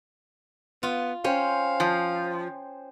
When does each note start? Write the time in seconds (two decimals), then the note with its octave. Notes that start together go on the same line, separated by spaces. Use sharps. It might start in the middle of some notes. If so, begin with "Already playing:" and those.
0.83 B3 F4
1.24 C#4 C5 F5 G5 G#5
1.80 F3